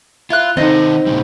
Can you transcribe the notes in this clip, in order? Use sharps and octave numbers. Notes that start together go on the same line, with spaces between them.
E4 F4 F#6
D#3 C4 D#4 A4 D#5
A#2 C#3 G3